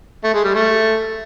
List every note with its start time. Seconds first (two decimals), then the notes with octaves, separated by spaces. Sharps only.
0.24 A3
0.34 G#3
0.44 G3
0.54 A3